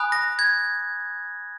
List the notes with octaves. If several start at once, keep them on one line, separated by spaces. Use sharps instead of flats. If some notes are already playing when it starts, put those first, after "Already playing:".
Already playing: G#5 B5 D#6 F#6
A#6
G#6